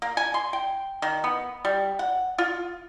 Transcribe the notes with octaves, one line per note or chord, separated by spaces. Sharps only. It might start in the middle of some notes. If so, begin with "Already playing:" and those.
A#3
G#5
C6
G5
D#3
B3
G3
F#5
F4